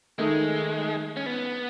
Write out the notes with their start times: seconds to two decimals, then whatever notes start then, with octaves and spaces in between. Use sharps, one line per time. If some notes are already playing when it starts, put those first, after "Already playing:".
0.18 D#3 G#3 A3 D#4
1.17 C#4
1.26 B3